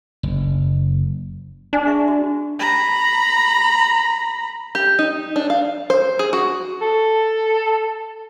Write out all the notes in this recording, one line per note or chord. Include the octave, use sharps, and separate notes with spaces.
F#1
D4 D5 G#5
G#4 E5 C#6
F#4
A#5 B5
G4
D#4
D4
F5
C5
G#4
F#4
A4